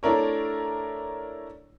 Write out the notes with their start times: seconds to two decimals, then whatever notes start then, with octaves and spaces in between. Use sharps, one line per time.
0.03 A3 D4 E4 A#4 C#5